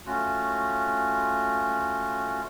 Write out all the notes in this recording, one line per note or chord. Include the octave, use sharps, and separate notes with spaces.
A3 C#4 F4 F#4